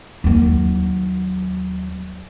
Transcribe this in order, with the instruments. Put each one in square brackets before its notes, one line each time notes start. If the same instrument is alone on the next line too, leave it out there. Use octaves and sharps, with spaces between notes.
[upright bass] D#2 F#3